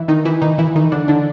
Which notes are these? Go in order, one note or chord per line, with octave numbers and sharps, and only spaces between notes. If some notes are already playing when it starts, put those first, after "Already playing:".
Already playing: E3 E4
D#3 D#4
E3 E4
D#3 D#4
E3 E4
D#3 D#4
D3 D4
D3 D4